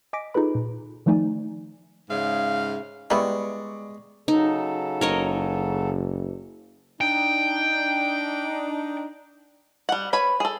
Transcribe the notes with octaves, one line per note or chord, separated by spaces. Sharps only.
D#5 G#5 D6 A#6 B6 D7
D#4 F4 G#4 A4 B4 B5
A#2
D#3 F3 A3 D#4 D5 G#5
G#2 C#3 E5 F5
G3 G#3 B3 E4 D5 C#6
C#3 F#3 D#4 A4
F#1 A#4 C#5 D#5
D4 D#4 G5
G3 F#5
B4 C#5 B5
G#4 A4